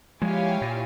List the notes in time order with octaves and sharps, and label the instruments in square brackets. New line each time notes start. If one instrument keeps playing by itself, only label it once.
[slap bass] F3 G#3 [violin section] E4 G4 C#5 F5 G#5
[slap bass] A#2